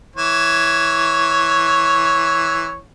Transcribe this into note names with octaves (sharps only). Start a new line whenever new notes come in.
E3 C#5